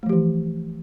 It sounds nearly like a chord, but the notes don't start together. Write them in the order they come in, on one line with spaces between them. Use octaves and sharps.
A3 F3 G4 E3